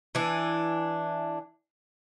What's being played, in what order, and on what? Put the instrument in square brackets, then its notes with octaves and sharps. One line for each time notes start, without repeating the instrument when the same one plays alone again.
[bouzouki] E3 D4